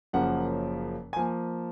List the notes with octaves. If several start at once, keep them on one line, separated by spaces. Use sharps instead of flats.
F#1 F#2 C#3 F3 A#3 F#5
G#5
F3 A#3